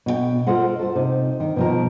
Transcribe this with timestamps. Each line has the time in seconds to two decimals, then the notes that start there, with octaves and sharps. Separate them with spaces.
0.06 B2 C5 G5
0.47 F4 A4 A#4 C5 D#5 F#5
0.79 A4 C5
0.96 C3 D#4
1.40 D#3
1.56 B2 F3 A#4